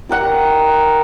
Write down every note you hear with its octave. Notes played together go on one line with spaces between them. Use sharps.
G4 A#4 F#5 A#5